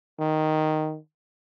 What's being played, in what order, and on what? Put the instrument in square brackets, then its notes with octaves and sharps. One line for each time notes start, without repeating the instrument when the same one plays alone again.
[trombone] D#3